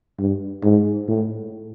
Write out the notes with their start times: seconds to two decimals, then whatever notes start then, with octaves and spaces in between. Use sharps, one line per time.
0.18 G2
0.64 G#2
1.08 A2